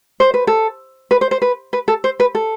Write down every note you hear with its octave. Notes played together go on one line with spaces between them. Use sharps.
C5
B4
A4
B4
C5
C5
B4
B4
A4
C5
B4
A4